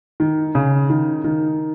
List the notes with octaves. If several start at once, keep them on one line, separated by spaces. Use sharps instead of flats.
D#3
C#3
D#3
D#3